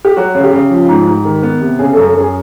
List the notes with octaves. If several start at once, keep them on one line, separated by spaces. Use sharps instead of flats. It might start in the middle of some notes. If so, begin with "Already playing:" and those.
G4
F#3 F#4
C#3
G4
C#3
F3
G#2
G#2
D#3
B3
C3
C#3 G#4
A4
F#2
A4
F#2 G#4